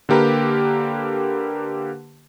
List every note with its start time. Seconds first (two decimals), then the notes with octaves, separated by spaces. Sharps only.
0.09 D3 A#3 G4 A#4 B4